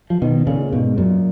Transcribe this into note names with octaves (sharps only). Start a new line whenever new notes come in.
F3
B2 D#3
A#2 C#3
G#2 B2
F#2 A#2